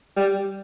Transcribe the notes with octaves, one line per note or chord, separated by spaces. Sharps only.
G3